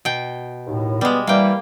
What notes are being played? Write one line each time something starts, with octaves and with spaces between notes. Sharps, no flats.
B2 G5
D#2 A2
G3 G#3 B3
E3 G3 A#3 G5